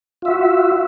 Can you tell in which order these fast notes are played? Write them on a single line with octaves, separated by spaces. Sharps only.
F4 E5 F#4